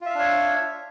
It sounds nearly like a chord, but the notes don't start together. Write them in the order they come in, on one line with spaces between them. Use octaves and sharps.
F4 E5 F5 D4 C#5